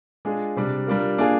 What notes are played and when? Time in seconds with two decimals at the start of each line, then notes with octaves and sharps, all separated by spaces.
0.25 G#3 D4 F4 G#4
0.57 C3 G3 D4
0.87 G3 D4 F4 A#4
1.18 A#3 D4 F4 G#4